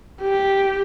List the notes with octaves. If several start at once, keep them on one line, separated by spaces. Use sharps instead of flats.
G4